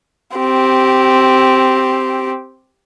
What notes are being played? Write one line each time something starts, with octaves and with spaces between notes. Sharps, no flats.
C4 G4